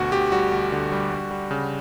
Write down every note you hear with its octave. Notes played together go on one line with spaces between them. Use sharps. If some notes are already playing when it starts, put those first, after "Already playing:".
Already playing: D2 B2 F#4
D2 G4
G3 F#4
D2
D3
G3
G3
G3
C#3